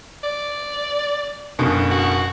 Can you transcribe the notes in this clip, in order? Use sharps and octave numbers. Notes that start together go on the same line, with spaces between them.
D5
F#1 B2 D3
F#4